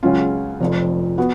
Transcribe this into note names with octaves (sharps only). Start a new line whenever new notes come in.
C#2 C#3 F#3 C#4 F4
F1 F2 F3
B3 F#4